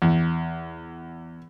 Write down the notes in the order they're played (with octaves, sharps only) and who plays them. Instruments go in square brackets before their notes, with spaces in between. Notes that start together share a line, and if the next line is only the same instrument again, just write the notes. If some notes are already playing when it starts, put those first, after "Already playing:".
[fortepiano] E2